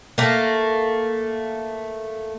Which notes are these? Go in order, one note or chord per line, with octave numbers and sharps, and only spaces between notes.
A3 A#3